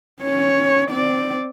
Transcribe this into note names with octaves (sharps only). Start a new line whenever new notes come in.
C#4 C#5
C4 D5